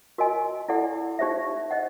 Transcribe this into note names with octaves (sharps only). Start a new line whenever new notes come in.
F#4 A#4 D#5 G#5
E4 A4 D5 F#5
D#4 G4 C5 E5
C5 D#5 F#5